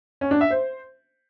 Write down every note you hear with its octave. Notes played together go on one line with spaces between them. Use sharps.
C#4
D4
E5
C5